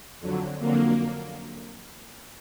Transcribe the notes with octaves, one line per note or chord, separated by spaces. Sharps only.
F2 D3 F#3
F2 D3 F#3 A#3